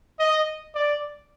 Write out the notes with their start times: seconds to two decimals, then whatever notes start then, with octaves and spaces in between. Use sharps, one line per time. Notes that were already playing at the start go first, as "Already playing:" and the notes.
0.19 D#5
0.75 D5